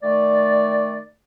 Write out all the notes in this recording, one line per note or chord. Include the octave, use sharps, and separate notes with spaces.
D#3 A3 D5